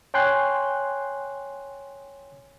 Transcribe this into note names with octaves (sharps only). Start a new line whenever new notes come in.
C#5 G5 G#5 C6 F#6